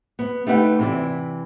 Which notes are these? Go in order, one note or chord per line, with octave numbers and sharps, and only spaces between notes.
B3
A3 D#4 G4 B4 F#5
C3 E3 D5